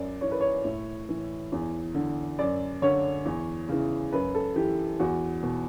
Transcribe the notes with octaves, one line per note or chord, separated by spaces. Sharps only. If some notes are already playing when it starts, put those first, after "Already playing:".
Already playing: F#2 D5
E3 C#5
B4
C#5
A2
E3
E2
D3
F#2 D5
D3 C#5
E2
C#3 E3
F#2 B4
A4
E3 G4
E2 F#4
B2